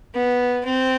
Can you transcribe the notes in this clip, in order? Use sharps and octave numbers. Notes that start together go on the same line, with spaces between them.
B3
C4